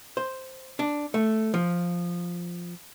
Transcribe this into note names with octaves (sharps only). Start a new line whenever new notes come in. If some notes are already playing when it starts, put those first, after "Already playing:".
C5
D4
A3
F3